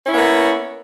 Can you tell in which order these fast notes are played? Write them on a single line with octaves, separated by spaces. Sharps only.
C#4 E4 C#5 B3 A#3